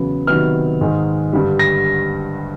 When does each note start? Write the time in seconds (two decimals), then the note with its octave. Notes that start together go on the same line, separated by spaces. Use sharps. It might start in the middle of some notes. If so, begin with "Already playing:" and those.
Already playing: E2 C#3 F#3 B3
0.27 C3 D#3 F#3 B3 F6
0.81 G#2 D#3 G#3
1.33 G2 D3 G3
1.59 A#6